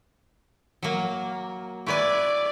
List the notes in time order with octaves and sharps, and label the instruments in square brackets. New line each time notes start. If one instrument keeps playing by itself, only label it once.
[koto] F#3 A#3
[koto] E4 B4 G#5 [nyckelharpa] D5